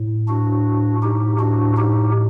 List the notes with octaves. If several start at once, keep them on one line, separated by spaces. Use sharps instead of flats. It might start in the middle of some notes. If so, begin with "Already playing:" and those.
Already playing: A2
D4 F#4
D#4 G4
D4 F#4
D#4 G4